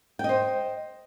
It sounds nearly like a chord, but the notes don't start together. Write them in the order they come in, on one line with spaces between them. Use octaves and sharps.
G5 D#5 C5